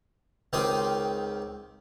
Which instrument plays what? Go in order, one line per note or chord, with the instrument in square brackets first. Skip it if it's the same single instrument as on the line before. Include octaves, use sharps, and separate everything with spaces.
[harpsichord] C#2 D#3 C4 G4 C6 D#6